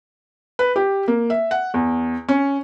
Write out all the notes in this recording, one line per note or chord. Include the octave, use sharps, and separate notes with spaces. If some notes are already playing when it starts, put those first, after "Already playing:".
B4
G4
A#3
E5
F#5
E2
C#4